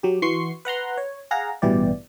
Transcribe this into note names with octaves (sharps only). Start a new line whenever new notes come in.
F#3 G4
E3 F#4 C6 C#6 C7
B4 F#5 A#5 C6
C#5
G#4 F5 F#5 A#5
A1 G2 B2 E3 G4 D5